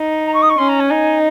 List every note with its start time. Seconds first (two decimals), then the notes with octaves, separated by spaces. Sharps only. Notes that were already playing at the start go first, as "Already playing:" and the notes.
Already playing: D#4
0.26 A#5
0.34 C#6
0.42 D#6
0.49 C#6
0.58 C#4 C6
0.68 A#5
0.80 G#5
0.91 D#4